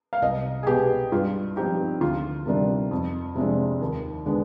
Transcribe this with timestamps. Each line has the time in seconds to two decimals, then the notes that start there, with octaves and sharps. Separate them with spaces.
0.13 F5
0.22 C2 D#5
0.63 G#4
0.66 B2 B3 G4
1.12 G2 F4
1.56 F3 C4 D#4 G4
2.01 D2 F4
2.46 C3 D#3 G3 D4
2.91 F2
3.35 C3 F3 G#3 D4
3.81 D#2
4.26 D3 G#3 B3 D4